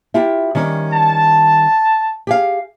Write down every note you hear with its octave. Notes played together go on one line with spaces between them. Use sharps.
E4 F4 G4
D#3 G3 C#4
A5
G4 G#4 F5